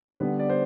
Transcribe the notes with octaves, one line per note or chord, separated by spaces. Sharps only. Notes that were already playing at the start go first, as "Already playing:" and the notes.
D3 G3 B3 B4
D5
C5